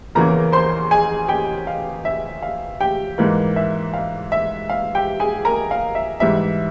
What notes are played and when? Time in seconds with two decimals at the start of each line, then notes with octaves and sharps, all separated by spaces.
0.15 E2 C#3 E3 A#3 C#4 A#4 A#5
0.52 C5 C6
0.91 G#4 G#5
1.28 G4 G5
1.67 F5
2.05 E5
2.42 F5
2.80 G4 G5
3.18 G#2 E3 A#3
3.56 E5
3.94 F5
4.32 E5
4.70 F5
4.95 G4 G5
5.20 G#4 G#5
5.45 A#4 A#5
5.71 F5
5.95 E5
6.20 G#2 E3 G3 E5